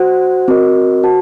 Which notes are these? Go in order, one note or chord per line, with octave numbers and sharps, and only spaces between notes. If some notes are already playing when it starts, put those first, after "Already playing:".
Already playing: F#4 C5 F#5
C4 F#4 A#4 D#5
F#4 C5 F#5 A5